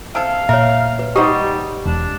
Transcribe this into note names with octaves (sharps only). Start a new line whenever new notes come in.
C3 A4 F5
A#2 A#4 C#5 E5
B4
G3 D#4 G4 C5 D#5 F#5
E1 D4